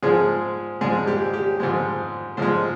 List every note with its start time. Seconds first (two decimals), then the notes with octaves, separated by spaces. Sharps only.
0.02 G#2 F3 G#3 G#4
0.81 G#2 F3 G#3 G#4
1.07 G4
1.34 G4
1.60 G#2 F3 G#3
2.37 G#2 F3 G#3 C5